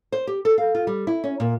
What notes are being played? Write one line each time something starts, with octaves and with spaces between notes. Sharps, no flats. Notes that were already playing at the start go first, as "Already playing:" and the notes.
C5
G4
A4
F5
F4
G3
E4
C#4
A#2